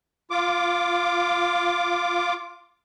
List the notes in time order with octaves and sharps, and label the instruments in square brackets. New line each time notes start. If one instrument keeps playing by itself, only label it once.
[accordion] F4 D6